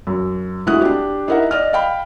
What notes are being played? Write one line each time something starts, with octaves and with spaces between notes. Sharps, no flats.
F#2
D2 G#3 E4 F#4 D#6 F#6
D4 G4
D#4 E4 A#4 E5 F#5
D5 D#5 F6
F5 G5 B5